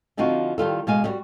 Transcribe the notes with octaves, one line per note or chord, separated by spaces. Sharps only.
D3 F3 C4 D#4 F4 F#4
D#3 G3 F4 A4
B2 G#3 F5 G#5
D3 G3 F#4